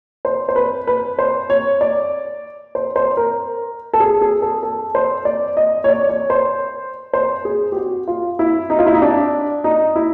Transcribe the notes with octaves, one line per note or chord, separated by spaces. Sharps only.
C5
C5
B4
B4
C5
C#5
D5
C5
C5
A#4
A4
G#4
G#4
A4
A4
C5
D5
D#5
C#5
D5
C#5
C5
C5
G#4
G4
F#4
F4
E4
D#4
F4
E4
D#4
D4
D#4
E4